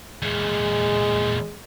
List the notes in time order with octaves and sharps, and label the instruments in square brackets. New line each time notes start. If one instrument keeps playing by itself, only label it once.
[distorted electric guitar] E2 A#2 [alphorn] G#3